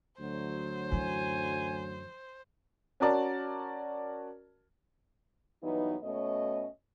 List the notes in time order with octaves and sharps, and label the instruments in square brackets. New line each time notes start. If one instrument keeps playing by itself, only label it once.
[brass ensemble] D2 F#3 [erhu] C5
[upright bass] F#2 E3 [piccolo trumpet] G#5
[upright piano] C#4 F#4 A#4 D5 A5
[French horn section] G2 E3 F#3 B3 D#4
B2 A3 C#4 C#5 D#5